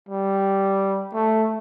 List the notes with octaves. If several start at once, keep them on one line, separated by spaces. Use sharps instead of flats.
G3
A3